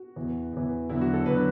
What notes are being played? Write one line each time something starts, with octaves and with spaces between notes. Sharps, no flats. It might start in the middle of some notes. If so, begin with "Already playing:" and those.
Already playing: F#4
E2 E3
E2 E3
E2 D3 F#3 E4
F#4
A4
E2 D3 F#3 B4